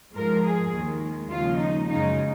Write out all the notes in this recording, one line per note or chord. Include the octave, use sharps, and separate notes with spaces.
G#2 F3 G#3 A#4
G#4
D#2 D#3 G#3
D#2 C#3 F3 G#3 F4
D#4
F#2 C#3 G#3 D#4